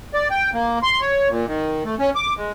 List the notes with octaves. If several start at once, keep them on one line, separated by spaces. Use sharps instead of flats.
D5
G5
A#3
C6
C#5
A#2
D#3
A3
C#4
D6
G#3